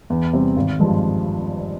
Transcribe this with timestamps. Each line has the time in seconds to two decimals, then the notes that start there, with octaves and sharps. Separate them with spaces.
0.10 E2
0.33 C3 G3 C4
0.56 G#1
0.79 G2 F3 G#3